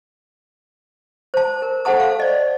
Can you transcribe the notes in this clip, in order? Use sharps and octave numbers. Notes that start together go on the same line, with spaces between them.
C5 A5
A#4
A4 C5 F#5 A5 D#6
F5
D5 D#5